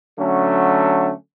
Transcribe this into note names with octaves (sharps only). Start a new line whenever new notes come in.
D3 F#3 A3 C#4